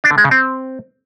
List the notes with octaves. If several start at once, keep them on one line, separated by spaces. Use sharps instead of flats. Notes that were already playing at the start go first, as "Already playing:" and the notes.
D4
D3
G#3
C#3
C4